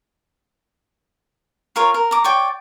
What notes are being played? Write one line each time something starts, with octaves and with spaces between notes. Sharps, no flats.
F4 A#4 C#5 F5
A#4
A#5 D6
C#5 D5 G5